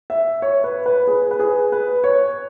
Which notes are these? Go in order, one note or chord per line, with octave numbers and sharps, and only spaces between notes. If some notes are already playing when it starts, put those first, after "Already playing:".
E5
C#5
B4
B4
G#4
B4
G#4
B4
C#5